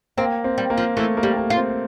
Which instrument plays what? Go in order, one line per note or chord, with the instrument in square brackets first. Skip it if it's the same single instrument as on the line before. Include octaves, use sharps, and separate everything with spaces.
[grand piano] A#3 [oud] C4
[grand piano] C4
[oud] G3
[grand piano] A#3
[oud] F3
[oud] E3 [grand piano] A3
[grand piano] A#3
[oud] G3
[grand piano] A#3
[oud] F4
[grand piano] C4